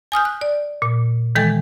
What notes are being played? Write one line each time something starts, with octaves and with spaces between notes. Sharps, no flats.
G#5 D#6 F6 G6
F#6
D5
A#2
D#3 E3 G#3 A4 G5 A6